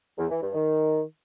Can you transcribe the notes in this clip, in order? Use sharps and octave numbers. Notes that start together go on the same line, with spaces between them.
E2
E3
G2
D#3